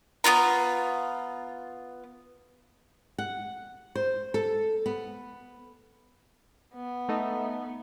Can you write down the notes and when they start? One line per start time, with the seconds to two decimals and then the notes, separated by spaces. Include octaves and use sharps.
0.24 B3 D4 F4 A#5
3.18 F#5
3.95 C5
4.34 A4
4.86 B3
6.74 B3
7.09 A3 D#4